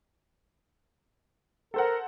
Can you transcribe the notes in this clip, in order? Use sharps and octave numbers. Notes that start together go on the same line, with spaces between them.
A4 A#4 C5 F#5